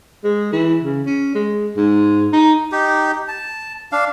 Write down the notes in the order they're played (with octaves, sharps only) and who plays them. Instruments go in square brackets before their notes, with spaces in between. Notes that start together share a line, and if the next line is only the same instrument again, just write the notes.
[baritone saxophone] G#3
E3
C#3
C#4
G#3
G#2
D#4
[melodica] D#4 G4
A5
D4 F5